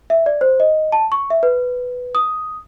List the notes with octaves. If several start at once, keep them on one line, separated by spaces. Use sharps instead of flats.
E5
D5
C5
D#5
A5
C#6
E5
B4
D#6